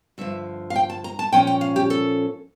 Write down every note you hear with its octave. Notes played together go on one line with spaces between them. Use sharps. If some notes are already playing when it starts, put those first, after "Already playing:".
G2 D3 F3 E5
F5
G5
A5
A#5
A5
A#2 F3 C#4 G5
G5
F5
G4
A4